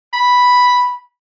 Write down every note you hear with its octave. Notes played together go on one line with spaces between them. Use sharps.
B5